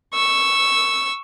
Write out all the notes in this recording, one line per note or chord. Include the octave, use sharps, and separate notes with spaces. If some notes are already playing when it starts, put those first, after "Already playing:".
C#6 E6